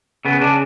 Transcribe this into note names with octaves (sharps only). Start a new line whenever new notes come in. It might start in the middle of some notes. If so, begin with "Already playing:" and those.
C#3 B3
C#3 D4